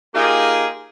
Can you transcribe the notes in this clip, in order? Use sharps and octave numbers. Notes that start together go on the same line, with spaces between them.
A#3 D#4 F4 G4 G#4